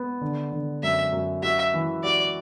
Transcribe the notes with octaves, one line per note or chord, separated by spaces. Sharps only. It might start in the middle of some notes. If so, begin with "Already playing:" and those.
Already playing: B3
D3
D3
F#2 E5
F#2
F#4 E5
E3
F#4 D5